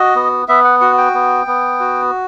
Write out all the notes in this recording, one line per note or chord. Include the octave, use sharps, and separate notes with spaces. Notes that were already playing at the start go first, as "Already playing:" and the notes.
Already playing: F#4 D#5
B3
B3 E5
F#5
F#4 F#5
G5
B3
B3
F#4